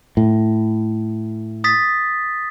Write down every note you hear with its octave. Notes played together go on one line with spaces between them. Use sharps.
A2
D#6 A6 B6